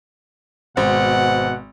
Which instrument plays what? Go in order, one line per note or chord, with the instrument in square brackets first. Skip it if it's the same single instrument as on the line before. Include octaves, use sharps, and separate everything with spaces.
[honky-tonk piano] G#1 [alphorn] B2 [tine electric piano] C5 [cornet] F#5